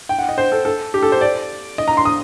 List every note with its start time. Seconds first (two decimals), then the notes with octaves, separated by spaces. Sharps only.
0.09 G5
0.19 F#5
0.29 D#5
0.38 C5
0.52 A4
0.65 A4
0.94 G4
1.03 A4
1.12 C5
1.21 D5
1.78 D#5
1.88 A#5
1.97 C6
2.05 D#6